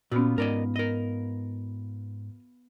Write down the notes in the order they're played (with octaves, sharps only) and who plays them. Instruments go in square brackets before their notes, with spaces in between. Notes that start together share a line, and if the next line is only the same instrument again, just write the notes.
[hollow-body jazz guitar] A#2 [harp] B3 F4 [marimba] C#4 F#4
[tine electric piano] G#2 [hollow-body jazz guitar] A#4 D5 D#5
[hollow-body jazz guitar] A#4 D#5